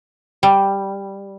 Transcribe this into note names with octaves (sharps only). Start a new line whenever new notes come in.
G3